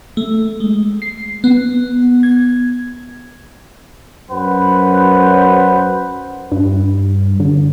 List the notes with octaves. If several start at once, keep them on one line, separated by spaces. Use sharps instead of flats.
A3
G#3
C7
B3
G#6
F#2 B4 C5 F#5
G2
D3